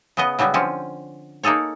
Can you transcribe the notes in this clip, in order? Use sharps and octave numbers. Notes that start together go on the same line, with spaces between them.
C#3 B3 D#5
C#3 F#3 G3 B3
D3 F3 C4 C#4
A#3 D#4 G#4 A4 C#5